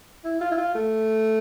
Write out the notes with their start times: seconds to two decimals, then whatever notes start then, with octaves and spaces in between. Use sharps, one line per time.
0.24 E4
0.41 F4
0.52 E4
0.57 F4
0.75 A3